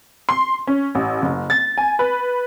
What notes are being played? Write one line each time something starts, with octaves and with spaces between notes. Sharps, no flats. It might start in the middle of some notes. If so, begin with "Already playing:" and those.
C6
C#4
A1
F#1
A6
G#5
B4